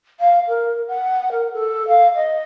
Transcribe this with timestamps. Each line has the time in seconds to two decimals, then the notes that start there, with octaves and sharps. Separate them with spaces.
0.20 F5
0.48 A#4
0.88 F#5
1.32 A#4
1.53 A4
1.88 F5
2.15 D#5